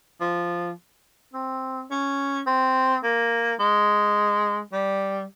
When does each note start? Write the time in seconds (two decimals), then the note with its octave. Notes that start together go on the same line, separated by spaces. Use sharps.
0.21 F3
1.33 C4
1.91 C#4
2.47 C4
3.03 A#3
3.59 G#3
4.73 G3